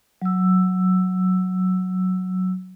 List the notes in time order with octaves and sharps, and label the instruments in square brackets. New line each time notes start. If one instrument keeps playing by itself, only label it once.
[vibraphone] F#3 E6